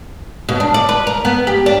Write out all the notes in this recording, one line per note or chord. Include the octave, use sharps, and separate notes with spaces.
B2
D4
D5
B4
A#4
B3
G4
D4